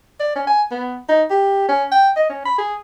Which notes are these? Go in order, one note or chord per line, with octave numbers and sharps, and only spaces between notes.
D5
C#4
G#5
B3
D#4
G4
C#4
G5
D#5
C#4
B5
G#4